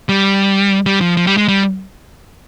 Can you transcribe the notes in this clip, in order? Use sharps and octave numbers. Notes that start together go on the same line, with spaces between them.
G3
G3
F3
F3
G3
G#3
G3